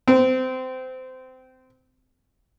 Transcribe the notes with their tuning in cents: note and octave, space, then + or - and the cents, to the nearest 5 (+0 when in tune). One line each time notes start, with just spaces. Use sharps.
C4 -25